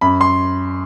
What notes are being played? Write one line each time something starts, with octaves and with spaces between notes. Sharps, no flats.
F#2 B5
C6